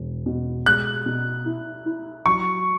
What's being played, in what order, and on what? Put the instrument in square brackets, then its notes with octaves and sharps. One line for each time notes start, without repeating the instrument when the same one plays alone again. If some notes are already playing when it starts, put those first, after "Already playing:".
Already playing: [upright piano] E1
B2
[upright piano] G#3 [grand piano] F#6
[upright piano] B2
E4
E4
[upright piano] F#3 [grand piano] C#6